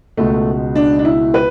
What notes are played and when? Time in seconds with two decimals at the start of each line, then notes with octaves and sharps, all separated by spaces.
0.17 C#2 B2 G#3 A3
0.76 D4
0.99 D4
1.05 E4
1.34 B4